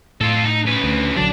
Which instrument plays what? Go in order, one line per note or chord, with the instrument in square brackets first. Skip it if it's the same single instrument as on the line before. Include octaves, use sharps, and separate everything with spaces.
[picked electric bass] A2 [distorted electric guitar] F4 A4
[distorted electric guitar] D#4
C#3 B4
[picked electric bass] D2
[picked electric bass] A#1 D3 F#3 [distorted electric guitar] D4